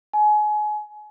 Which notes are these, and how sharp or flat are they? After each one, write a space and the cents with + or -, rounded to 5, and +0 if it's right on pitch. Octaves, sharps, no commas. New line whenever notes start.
G#5 +30